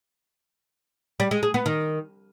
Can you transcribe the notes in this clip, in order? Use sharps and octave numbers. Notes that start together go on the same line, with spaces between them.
G3
G#3
G#4
B3
D#3